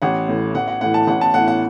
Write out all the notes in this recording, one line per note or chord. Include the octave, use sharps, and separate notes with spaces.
A1 F#5
A2 E3
A1 F#5
F#5
A2 E3 F#5
A5
A1 F#5
A5
A2 E3 F#5
F#5